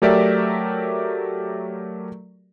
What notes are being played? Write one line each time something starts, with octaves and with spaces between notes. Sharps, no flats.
F#3 A3 G4 A#4 D5 E5